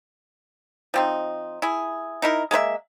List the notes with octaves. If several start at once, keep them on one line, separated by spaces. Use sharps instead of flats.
F3 C4 D#4
E4 G#4
D#4 E4 A#4
G#3 A#3 B4 E5